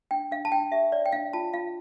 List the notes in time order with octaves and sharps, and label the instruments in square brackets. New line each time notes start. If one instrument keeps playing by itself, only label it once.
[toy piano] D4 G5
D4 F5
A5
D4 G5
G4 E5
C#5 D5
G5
D4 F5
F4 A5
F4 F5